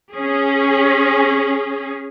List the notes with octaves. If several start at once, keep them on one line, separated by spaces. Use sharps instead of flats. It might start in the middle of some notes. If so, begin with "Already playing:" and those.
C#4 G#4